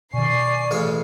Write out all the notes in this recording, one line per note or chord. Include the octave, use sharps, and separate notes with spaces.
B2 D#3 D5 G#5 C#6 C7
A1 C#3 C#5